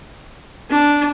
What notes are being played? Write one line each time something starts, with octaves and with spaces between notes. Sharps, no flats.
D4